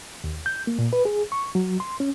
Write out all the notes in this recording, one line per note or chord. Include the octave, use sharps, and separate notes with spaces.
D#2
G6
A#3
A#2
B4
G#4
C#6
F#3
C6
C#4